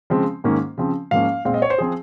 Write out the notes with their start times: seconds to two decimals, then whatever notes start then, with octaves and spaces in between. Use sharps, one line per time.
0.10 C#3 F3 G#3 C4
0.44 G#2 D#3 A#3 C#4
0.78 C#3 F3 C4
1.11 G#2 F3 A#3 C#4 F5
1.45 A#2 G#3 C4 F5
1.54 D#5
1.62 C#5
1.70 C5
1.78 F3 C4 G#4